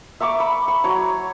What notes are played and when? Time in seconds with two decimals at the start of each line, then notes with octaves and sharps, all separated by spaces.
0.20 E5 A#5 C#6 D6
0.40 B5
0.68 C#6
0.84 F#3 C#5 A#5